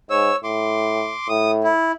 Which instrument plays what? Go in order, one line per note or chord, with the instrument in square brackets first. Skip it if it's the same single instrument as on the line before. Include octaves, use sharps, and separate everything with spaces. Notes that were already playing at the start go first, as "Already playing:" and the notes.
[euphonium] G#2 [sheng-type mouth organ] C#5 E6
[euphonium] A2 [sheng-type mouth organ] C6 D6
[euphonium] A2 [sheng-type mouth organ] D#6
[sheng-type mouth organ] E4